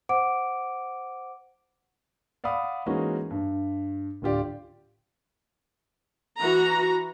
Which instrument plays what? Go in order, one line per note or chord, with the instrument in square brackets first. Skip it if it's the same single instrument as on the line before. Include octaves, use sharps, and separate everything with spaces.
[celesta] C5 F#5 D6 D7
[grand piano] D5 F5 F#5 B5 D#6
E3 G#3 A#3 C#4 D#4 F#4
G2
D1 D3 F4 G4 D5
[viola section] E3 F#4 A#5